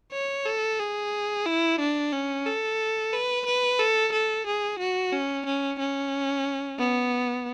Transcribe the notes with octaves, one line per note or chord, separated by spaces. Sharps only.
C#5
A4
G#4
E4
D4
C#4
A4
B4
B4
A4
A4
G#4
F#4
C#4
C#4
C#4
B3